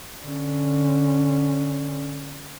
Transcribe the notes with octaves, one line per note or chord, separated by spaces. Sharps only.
D3 C#4